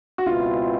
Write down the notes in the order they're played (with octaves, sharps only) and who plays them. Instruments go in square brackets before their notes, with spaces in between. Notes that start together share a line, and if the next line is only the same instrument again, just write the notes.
[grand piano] F#4
[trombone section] C#2 B2 G#3 C4 E4 [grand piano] F4